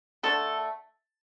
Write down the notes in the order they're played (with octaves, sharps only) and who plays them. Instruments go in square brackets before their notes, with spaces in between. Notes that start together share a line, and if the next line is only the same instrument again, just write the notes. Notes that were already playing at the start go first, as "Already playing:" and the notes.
[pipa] D3 A3 D4 [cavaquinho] A4